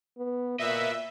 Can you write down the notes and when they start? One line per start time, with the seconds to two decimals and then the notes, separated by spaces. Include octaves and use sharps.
0.18 B3
0.59 A#2 B4 D#5 E5